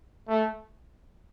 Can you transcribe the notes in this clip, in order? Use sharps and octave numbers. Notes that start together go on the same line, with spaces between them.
A3